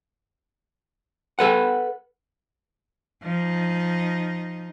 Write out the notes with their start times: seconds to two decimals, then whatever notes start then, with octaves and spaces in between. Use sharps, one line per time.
1.39 A4 B4 F#5
3.23 F3 D#4